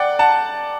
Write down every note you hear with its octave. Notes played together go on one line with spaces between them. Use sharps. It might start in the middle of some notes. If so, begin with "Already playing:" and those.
Already playing: D5 F#5 G5
F#5 A5